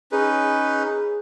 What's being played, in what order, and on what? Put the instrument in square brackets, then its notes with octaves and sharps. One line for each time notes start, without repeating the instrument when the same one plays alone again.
[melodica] C#4 D#4 B4 [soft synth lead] G#4